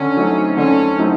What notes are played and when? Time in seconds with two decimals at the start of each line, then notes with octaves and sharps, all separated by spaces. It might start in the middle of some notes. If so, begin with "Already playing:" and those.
Already playing: D3 C#4
0.16 F#3 A3 C4 D#4
0.57 D3 C#4
0.98 F#3 A3 C4 D#4